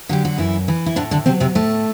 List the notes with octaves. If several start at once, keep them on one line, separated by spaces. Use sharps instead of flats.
D3 F#3 G4
F#4
F#2 E3 E4
E3
E4
A2 D3 D4
D3 D4
C3 F#3 C4
C3 C4
A2 A3